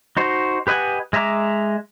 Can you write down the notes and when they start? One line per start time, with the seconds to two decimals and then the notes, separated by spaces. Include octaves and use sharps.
0.17 D#4 F#4 C5
0.67 G4 B4 D#5 F#5 G#5
1.13 G#3 D#5 E5 A#5 D6